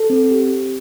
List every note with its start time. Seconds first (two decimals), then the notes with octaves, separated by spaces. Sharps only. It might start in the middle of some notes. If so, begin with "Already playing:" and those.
Already playing: A4
0.10 C4
0.31 G4